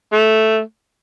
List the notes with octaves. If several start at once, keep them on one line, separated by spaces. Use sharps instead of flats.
A3